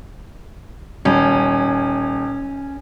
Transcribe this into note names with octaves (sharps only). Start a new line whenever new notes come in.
D#1 C#4